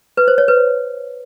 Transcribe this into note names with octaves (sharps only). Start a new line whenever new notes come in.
B4
C5
C#5
B4